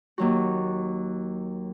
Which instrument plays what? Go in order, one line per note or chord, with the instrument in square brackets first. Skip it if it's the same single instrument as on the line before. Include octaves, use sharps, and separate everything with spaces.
[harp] D#2 F#3 F#4